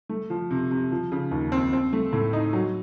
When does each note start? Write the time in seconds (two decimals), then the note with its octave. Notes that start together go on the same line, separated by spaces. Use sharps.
0.09 A3
0.30 F3
0.51 C3
0.71 C3
0.92 F3
1.12 C#3
1.31 D#2
1.52 C4
1.73 C4
1.93 A3
2.13 A2
2.33 D#4
2.53 F#3